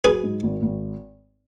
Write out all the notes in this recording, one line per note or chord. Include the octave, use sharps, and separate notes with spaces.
F#3 G#4 B4
G#2
G#1
G#1